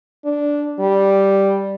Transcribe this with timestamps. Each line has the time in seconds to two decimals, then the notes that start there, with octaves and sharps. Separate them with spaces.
0.25 D4
0.80 G3